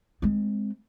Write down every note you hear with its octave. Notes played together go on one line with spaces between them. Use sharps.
G#3 C4